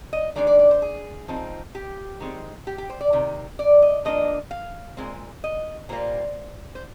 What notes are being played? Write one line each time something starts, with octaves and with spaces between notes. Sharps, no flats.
D#5
D#3 G#3 D4 D5
D5
D5
C5
G#4
F3 C4 D#4
G4
D#3 G#3 C4
G4
G4
C5
D5
C3 D#3
D5
D#5
F3 A#3 D4 D#5
F5
A#2 G#3 C4
D#5
A#2 G3 A#3 C5
C5